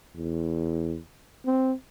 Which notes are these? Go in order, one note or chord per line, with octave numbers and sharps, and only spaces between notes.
E2
C4